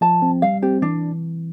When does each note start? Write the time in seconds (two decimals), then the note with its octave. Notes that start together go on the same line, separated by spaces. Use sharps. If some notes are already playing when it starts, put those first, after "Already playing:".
0.01 F3 A5
0.22 C4
0.42 G3 F5
0.62 C4 G4
0.82 E3 D4